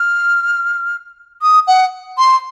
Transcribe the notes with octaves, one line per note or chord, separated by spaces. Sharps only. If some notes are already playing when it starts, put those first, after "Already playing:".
Already playing: F6
D#6
F#5
C6